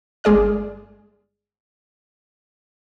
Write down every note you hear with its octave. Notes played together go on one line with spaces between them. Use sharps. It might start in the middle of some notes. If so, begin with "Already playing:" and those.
G1 G#3 G#4 D5 F6